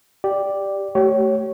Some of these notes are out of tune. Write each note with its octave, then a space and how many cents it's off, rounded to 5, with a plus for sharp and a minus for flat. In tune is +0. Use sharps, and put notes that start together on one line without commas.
G4 +0 D5 +0
A3 +0 G4 -30 C#5 +0